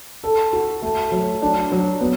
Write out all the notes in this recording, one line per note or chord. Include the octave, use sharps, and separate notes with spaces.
A4
F#4
A3
F#3
D4
F#3
B3